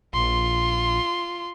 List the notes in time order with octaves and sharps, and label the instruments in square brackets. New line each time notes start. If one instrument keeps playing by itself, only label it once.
[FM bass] A#1 [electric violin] F4 C6